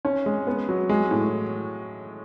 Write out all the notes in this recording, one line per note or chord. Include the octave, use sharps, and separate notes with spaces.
C#4
G#3
B3
F#3
G#3
A2